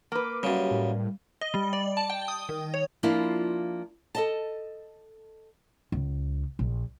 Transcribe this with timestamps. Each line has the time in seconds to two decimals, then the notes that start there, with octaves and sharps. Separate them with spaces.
0.12 A#3 B4 D6
0.43 F#2 C#3 G3
0.71 A2
1.41 D#5
1.54 G3
1.73 D5
1.97 A5
2.10 G5
2.28 D#6
2.49 D#3
2.74 C#5
3.03 F3 A#3 D4 E4 F4
4.15 A4 D#5 A5
5.92 C#2
6.59 A#1